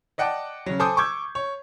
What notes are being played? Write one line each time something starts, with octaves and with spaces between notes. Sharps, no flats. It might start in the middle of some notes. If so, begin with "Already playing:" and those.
D5 D#5 F#5 G5 A5 D6
C#3 F#3
A4 C5 G#5 D6 D#6 G6
C#6 D6 E6 G6 G#6
C#5